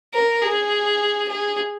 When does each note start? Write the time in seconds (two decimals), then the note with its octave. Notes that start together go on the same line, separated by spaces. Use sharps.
0.14 A#4
0.42 G#4
1.28 G#4